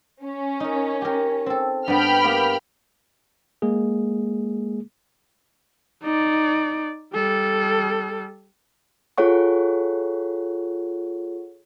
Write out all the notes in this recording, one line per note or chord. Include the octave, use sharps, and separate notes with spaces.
C#4
D#4 A#4
G4 A#4
C4 A4
G2 B3 G5 B5 F6
A#3 B3 G4
G#3 A#3 G#4
D#4 D5
G3 A4
F4 G#4 A4 C#5 F#5 C#6